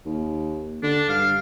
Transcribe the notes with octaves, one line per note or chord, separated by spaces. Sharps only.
D#2
D3 D4
G2 F5